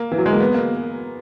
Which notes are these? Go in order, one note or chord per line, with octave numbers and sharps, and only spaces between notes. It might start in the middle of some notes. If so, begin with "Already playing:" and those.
Already playing: A#3
E3
F#3
G#3
A#3
B3
A#3